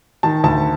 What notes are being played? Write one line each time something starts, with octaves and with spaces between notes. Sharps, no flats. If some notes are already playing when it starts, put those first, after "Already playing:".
D#3 A5
D2 A5